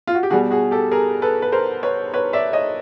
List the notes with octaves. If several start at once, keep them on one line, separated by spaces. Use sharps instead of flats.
F4
F#4
G4
B2 G3 F#4 G#4
F#4 G#4
G4 A4
G#4 A#4
A4 B4
B4
A#4 C5
B4 C#5
B4 C#5
D5 E5
C#5 D#5